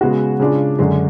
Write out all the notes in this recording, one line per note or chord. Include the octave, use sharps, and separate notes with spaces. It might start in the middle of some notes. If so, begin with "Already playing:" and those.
C#3 G#3 B3 F#4
C#3 G#3 D4 F4
F#2 D3 G#3 D4